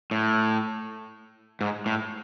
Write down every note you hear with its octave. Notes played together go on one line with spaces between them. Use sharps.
A2
G#2
A2